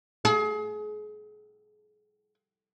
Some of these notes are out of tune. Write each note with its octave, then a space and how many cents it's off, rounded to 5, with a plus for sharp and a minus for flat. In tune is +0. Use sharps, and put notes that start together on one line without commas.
G#4 +30